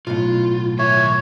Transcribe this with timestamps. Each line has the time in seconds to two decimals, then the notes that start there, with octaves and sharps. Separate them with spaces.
0.07 B1 A2 F4
0.79 D#3 C#5 E5